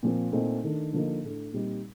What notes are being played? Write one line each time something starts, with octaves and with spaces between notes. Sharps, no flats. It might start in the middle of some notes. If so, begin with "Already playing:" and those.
A#2 F3 C4
A#2 A3 C4 D#4
D#3 A3 D4
D3 F3 A#3 D#4
A2 A3 D4
A#2 G3 C4 D#4